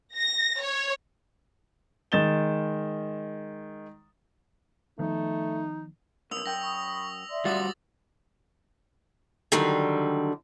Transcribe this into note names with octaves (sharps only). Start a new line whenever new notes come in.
A#6
C#5
D#3 G#3 A6 E7 G7
D#3 F3 A3 B3 D#4
B1 G#2 C#4 A#4 D#6 E6 F7
F#2 G5 A#6
B5 C#6 D#6
D5 E5 C6
F#2 F3 G3 F4 F#4 D6 D#6 A6
D3 D#3 F#3 G3